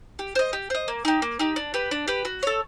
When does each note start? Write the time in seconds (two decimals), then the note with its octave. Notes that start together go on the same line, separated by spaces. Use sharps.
0.19 G4
0.35 C5 D#5
0.53 G4
0.70 C5 D#5
0.88 A#3
1.05 D#4 G4
1.22 A#3
1.39 D#4 G4
1.56 D4
1.74 G4 B4
1.91 D4
2.08 G4 B4
2.25 F#4
2.43 A4 C#5